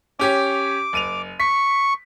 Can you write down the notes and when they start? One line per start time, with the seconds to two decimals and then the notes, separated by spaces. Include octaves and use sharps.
0.19 C#4 G4 C#5 D6
0.93 F#1 D#7 F7
1.40 C#6 B6